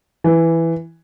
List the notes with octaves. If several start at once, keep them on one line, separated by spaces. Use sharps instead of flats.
E3